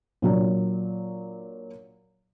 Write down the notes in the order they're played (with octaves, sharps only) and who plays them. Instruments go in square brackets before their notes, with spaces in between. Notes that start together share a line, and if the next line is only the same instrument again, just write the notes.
[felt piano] A#2 F#3 D4